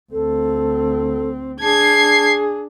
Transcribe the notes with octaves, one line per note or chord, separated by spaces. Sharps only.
D2 C4 A4
D4 G#4 A5 G#6 C7